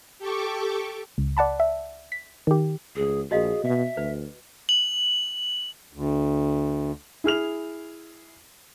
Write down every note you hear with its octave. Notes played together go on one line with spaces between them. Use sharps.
G4 A4 C#6 D6
C#2
D5 F#5 A5 B5
E5
B6
D#3 G4
C#2 G#4
A#1 F#4 G#4 D#5 F5
B2 E5
D2 B4
F#7
D2
E4 G#4 F6 F7